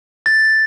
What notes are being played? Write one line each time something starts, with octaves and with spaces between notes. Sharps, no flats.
A6